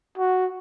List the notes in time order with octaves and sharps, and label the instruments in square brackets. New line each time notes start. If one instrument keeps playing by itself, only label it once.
[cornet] F#4